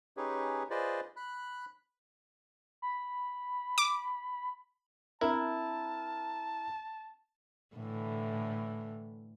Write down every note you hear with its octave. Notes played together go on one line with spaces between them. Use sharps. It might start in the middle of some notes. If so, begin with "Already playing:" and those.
C#4 D#4 G4 G#4 B4 C#5
F4 G#4 B4 C5 D5 D#5
B5 F#6
B5
D6
C4 D4 E4 A#4 E5 A5
A2 D3 E3